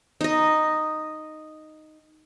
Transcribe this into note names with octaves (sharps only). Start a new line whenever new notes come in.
D#4 D#5